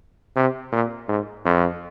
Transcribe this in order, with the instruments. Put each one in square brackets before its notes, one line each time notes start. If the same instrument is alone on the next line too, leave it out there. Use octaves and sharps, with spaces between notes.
[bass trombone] C3
A#2
G#2
F2